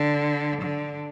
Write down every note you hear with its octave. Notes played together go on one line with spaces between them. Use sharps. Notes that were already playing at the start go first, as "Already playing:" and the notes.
Already playing: D3
D3